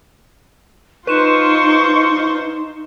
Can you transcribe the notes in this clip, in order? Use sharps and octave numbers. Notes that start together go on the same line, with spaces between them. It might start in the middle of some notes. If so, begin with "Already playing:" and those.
D#4 F4 B4 C5 C#6 E7